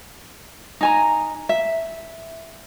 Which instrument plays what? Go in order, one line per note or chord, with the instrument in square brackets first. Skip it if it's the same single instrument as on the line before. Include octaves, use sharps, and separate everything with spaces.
[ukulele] D#4 G#5 A#5
E5